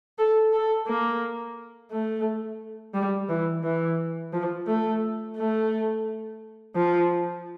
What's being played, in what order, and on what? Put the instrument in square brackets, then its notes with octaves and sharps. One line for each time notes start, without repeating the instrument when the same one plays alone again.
[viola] A4
A4
A#3
A3
G3
E3
E3
F3
A3
A3
F3